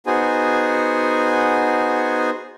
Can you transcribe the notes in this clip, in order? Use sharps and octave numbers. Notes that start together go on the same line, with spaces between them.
B3 D#4 F#4 G#4 C5 G#5